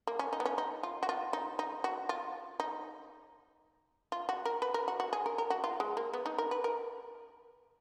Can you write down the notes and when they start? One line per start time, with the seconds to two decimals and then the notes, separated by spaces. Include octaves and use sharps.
0.07 A#3
0.19 C#4
0.33 D#4
0.40 B3
0.45 C#4
0.58 D#4
0.83 F4
1.03 F#4
1.09 F4
1.33 D#4
1.59 D#4
1.84 F#4
2.09 F4
2.60 D#4
4.12 F4
4.29 F#4
4.45 A#4
4.62 B4
4.74 A#4
4.88 F#4
5.00 F#4
5.13 G#4
5.26 A#4
5.38 A#4
5.50 F#4
5.64 F4
5.80 G#3
5.97 A#3
6.13 B3
6.26 D#4
6.38 A#4
6.51 B4
6.64 A#4